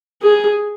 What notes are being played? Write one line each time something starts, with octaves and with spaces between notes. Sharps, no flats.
G#4